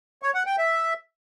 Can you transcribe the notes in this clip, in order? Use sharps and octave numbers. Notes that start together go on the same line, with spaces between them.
C#5
F#5
G5
E5